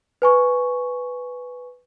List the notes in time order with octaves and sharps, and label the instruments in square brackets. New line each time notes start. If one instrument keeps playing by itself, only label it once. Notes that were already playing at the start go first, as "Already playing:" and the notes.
[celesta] B4 G#5 C#6